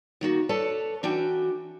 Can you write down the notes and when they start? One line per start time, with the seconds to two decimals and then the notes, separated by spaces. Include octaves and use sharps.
0.21 D#3 A#3 F#4
0.49 A4 B4 C#5 D5 A5
1.03 E3 C#4 D4 F#4 G5